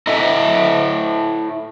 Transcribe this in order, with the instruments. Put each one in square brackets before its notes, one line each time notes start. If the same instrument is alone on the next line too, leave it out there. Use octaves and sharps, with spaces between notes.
[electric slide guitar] E4 A4 D#5 E5